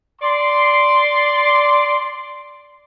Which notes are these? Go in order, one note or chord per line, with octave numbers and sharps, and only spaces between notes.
D5 C6